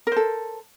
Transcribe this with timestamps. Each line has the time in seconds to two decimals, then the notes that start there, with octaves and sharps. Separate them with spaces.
0.07 A#4
0.12 C5
0.16 A4